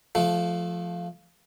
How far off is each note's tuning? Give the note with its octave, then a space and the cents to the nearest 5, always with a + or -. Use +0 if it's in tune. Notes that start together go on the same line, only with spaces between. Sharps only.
F3 +0 A3 -25